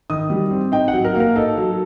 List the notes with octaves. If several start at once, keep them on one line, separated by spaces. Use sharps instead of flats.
D#3 D#6
G3
C4
D#4 G5
F#5
F#3
A#4
A#3 A#4
D#4 A4
F#3